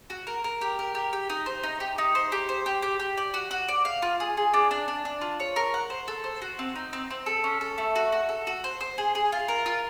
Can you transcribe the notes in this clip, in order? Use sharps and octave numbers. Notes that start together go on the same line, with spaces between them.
F#4
A#4
A#4
G4
A#4
G4
G4
D#4
C5
D#4
G4
D#4
C5
G4
C5
G4
G4
G4
D5
F#4
F#4
D5
F5
F4
G#4
G#4
D4
D4
D4
D4
F4
C#5
A#4
F#5
C5
A4
C5
F#4
C4
D#4
C4
C4
A4
C#4
A4
A3
F#4
F#4
A4
F#4
C5
C5
G#4
G#4
F4
A#4
F4